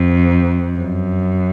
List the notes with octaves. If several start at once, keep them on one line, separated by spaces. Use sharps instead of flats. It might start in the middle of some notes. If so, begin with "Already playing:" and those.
Already playing: F2
F#2